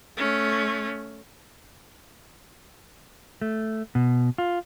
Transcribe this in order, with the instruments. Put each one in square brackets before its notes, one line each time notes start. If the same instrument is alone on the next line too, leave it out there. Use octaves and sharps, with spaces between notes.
[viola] A3 C#4
[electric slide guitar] A3
B2
F4